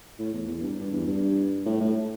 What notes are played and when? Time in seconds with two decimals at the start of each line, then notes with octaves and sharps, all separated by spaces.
0.19 A2
0.33 E2
0.48 E2
0.62 G2
0.78 G2
0.92 E2
1.07 G2
1.66 A2
1.80 A2